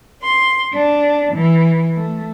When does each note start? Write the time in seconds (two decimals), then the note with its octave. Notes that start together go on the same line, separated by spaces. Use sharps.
0.23 C6
0.73 D4
1.34 E3
1.95 A3